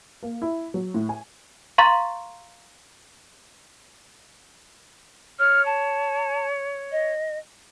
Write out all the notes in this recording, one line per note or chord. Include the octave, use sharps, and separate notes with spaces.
A#3
E4
F#3
A2
G#5
F5 A#5 C6 C#6 A6
C#5 F6
A5
D#5